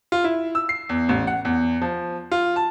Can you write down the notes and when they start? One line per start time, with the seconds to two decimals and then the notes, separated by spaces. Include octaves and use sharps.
0.12 F4
0.24 E4
0.55 E6
0.69 C7
0.89 E2
1.09 A1
1.27 F#5
1.45 E2
1.81 F3
2.31 F4
2.56 A5